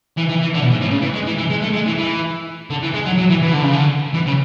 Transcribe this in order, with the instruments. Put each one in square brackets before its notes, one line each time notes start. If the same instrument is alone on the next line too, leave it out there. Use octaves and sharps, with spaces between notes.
[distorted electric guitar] E3
E3
E3
D3
B2
G#2
A2
C#3
E3
G#3
E3
E3
G#3
A3
G#3
E3
E3
D3
E3
G#3
F#3
F#3
E3
E3
D3
C#3
D3
E3
C#3